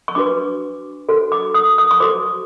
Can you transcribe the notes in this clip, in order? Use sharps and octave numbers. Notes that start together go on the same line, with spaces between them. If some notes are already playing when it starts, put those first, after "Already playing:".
C#6
D4 F#4 B4 D6
D4 F#4 A4 C5
D6
D#6
D#6
C#6
F#4 A4 C5 D6